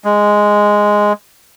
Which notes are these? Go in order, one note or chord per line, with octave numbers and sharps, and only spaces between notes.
G#3